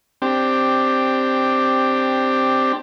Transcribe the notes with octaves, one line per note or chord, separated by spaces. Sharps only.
C4 D4 G4